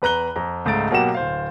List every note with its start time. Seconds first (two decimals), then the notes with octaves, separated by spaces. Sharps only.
0.02 E2 B4 A#5 F#6 G7
0.36 F2 A#5
0.65 C#2 G#2 A3 A6 D7
0.91 B2 F#3 A#3 G4 F#5 E7
1.14 D1 C5 F5